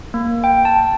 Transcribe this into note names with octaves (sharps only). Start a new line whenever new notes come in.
A#3
G5
A5